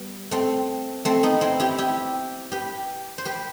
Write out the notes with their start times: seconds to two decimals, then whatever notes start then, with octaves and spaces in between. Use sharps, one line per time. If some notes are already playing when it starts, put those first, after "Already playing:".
Already playing: G3 B3
0.31 A3 C4
1.05 A3 C4
1.23 B3 D#4
1.41 C4 E4
1.60 E4 G4
1.78 E4 G4
2.52 G4 B4
3.18 C5
3.25 G4 B4